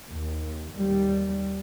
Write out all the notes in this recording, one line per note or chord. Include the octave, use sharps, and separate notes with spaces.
D#2
D#2 G3